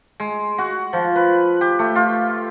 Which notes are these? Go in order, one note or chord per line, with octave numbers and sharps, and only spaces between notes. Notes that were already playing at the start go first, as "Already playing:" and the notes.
G#3
F#4
F3
B4
G4
A3
F4